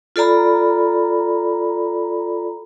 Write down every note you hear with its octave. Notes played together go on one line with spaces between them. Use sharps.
F4 A4 D5 A#5 B5